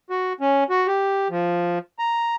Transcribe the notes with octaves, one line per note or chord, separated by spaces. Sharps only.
F#4
C#4
F#4
G4
F3
A#5